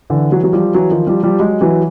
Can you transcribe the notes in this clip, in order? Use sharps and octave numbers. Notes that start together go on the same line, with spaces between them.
D3 E3
E3 F#3
F#3
F3 G3
E3 F#3
D#3 F3
F3 G3
F3 G3
F#3 G#3
E3 F#3